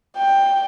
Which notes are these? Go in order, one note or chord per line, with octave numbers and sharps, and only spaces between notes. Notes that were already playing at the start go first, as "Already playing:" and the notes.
G5